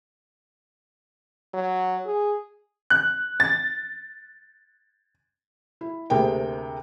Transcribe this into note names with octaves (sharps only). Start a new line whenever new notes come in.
F#3
G#4
F#6
A6
E4
D2 C3 A#3 G#4 G5